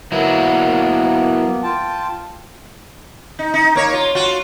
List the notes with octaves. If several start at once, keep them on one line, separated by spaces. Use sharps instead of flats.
F#3 A#3 B3 E4
F4 G5 A5
D#4
D#4
A#3 C#5
F4
F4 F#4